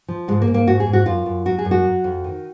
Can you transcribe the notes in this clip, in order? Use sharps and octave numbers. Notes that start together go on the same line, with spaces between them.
F3
G#2 G#3
A#3
G#2
A#3
G#2 F#4
G#4
G#2
F#4
F#2 F4
F#2
F#3 F#4
G#4
F#2
F#4
F#3
F2
D#3